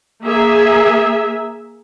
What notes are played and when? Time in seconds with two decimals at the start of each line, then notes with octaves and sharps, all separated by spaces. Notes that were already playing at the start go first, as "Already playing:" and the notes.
0.22 A#3 G#4 E5